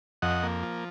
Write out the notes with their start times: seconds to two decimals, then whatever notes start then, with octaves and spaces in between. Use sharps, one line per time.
0.22 F2 D#5 F#5
0.43 A#3
0.63 F3